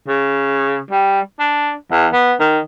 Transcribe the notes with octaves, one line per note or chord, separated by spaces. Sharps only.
C#3
G3
D4
E2
B3
D#3